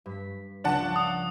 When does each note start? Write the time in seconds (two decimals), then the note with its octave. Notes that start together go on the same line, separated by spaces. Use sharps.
0.06 G2 B6
0.64 C#2 F3 D4 F#5 A5 A#6
0.96 D#6